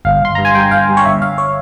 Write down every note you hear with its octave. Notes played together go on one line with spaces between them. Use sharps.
G1 F5
G1 C6
G2 A#5
G#5
G2 G5
G1 F5
G2
C#5
G1 E5
G1 F5
C#5